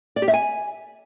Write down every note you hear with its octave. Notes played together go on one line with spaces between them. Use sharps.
D5
G4
E5
G#5